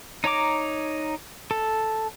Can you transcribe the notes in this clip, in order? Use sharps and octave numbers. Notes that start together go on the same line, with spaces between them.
D#4 C#5 A#5 D6
A4